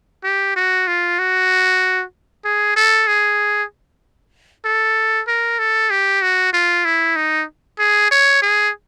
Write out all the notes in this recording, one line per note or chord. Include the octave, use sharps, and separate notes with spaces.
G4
F#4
F4
F#4
G#4
A4
G#4
A4
A#4
A4
G4
F#4
F4
E4
D#4
G#4
C#5
G#4